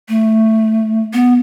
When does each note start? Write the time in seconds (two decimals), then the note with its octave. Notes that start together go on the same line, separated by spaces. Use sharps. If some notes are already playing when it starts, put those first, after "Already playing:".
0.09 A3
1.14 B3